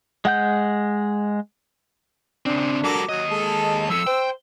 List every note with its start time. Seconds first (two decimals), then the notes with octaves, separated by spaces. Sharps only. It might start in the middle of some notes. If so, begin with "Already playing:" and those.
0.25 G#3 F#5 G6
2.46 C#3 C4 D4
2.84 G3 F#4 A4 A#4 D6
3.09 D#2 F#3 D#5
3.30 G#3 A4 A5
3.90 F3 A4 E6
4.07 C5 G5